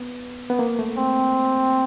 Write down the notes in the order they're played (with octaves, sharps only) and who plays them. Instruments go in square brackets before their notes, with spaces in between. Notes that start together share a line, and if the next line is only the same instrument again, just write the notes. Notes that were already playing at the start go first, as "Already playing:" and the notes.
Already playing: [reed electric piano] B3
B3
A#3
A3
[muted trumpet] C4